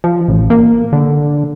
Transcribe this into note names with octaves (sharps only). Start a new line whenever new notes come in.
F3
A1
A#3
D3